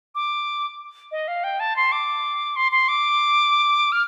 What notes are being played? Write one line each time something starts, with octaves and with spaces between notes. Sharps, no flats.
D6
D#5
F5
G5
A5
C6
D6
C6
C6
D6
F6